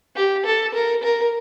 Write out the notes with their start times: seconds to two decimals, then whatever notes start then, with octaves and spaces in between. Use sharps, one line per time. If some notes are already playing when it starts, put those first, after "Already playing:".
0.16 G4
0.46 A4
0.74 A#4
1.03 A#4